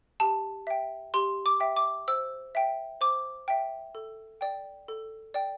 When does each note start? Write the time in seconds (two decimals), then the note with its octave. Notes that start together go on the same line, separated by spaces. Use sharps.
0.20 G4 A5
0.67 E5 G5
1.14 G4 C6
1.46 D6
1.60 E5 G5
1.76 D6
2.08 C5 E6
2.55 E5 G5
3.01 C5 D6
3.48 E5 G5
3.95 A4
4.41 D5 G5
4.88 A4
5.34 D5 G5